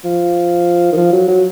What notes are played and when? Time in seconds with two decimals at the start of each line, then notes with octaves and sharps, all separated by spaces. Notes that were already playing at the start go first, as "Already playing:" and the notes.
0.04 F3
0.92 D#3
0.97 F3
1.12 F#3
1.28 F#3